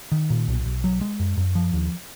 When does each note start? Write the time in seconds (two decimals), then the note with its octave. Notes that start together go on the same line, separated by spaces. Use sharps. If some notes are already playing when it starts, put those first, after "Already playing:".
0.12 D#3
0.30 A#2
0.48 B1
0.66 B1
0.84 F#3
1.01 G#3
1.20 F#2
1.37 F#2
1.55 F3
1.73 D#2